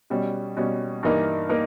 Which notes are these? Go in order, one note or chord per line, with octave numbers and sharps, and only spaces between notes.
B2 G3 C#4
B2 G3 C#4
G2 E3 A#3 D#4 A#4
A#3 D#4 A#4